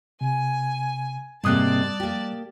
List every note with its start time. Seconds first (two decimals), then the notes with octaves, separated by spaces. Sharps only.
0.21 C3 G#5
1.44 G#2 C3 G3 A#3 D5 A5 D#6 F#6
2.00 A#3 G4